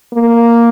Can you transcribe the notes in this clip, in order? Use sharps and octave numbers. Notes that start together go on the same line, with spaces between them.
A#3